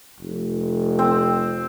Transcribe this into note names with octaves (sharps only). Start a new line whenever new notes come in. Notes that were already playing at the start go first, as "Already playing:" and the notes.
F1
C4